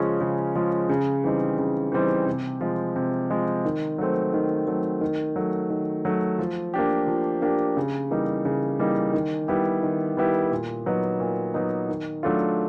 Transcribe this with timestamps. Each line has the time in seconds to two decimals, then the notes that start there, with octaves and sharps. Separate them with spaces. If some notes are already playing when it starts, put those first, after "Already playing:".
Already playing: C#3 F3 G#3 C#4
0.21 C#3
0.55 F3 G#3 C#4
0.89 C#3
1.24 E3 G3 C4 D#4
1.59 C#3
1.92 E3 G3 C4 D#4
2.26 C3
2.61 F3 G#3
2.96 C3
3.31 F3 G#3
3.65 D#3
3.98 F#3 A3 C4
4.34 D#3
4.67 F#3 A3 C4
5.01 D#3
5.36 F#3 A3
5.70 D#3
6.05 F#3 A3
6.39 F3
6.74 A#3 D4 G4
7.07 F3
7.42 A#3 D4 G4
7.77 C#3
8.10 E3 G3 A#3 D#4
8.45 C#3
8.80 E3 G3 A#3 D#4
9.13 D#3
9.48 G3 B3 E4 G4
9.83 D#3
10.17 G3 B3 E4 G4
10.51 A#2
10.86 F#3 B3 D#4
11.20 A#2
11.54 F#3 B3 D#4
11.89 D#3
12.23 F#3 A3 D4 F4